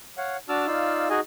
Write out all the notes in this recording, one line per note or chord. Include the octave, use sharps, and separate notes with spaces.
C#5 F5 F#5
D4 F#4 A5 D6 E6 F6
D#4 F4 D5 F5 E6
D#4 F#4 G#4 D#5 G#5